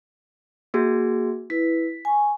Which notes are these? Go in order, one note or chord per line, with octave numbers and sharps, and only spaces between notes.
A#3 F#4 G#4
E4 B4 B6
G#5 C#6